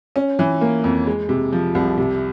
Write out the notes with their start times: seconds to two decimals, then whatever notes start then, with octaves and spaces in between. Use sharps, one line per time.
0.16 C#4
0.39 E3
0.61 A#3
0.84 F2
1.07 G#3
1.29 C3
1.52 F3
1.75 C2
1.98 C3